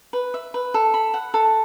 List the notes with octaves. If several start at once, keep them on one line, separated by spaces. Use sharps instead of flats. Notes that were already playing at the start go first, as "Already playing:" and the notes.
B4
E5
B4
A4
B5
F#5
A4